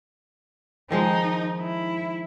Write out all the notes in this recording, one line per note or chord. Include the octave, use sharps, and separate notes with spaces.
D#3 F3 G#3 D#4
E4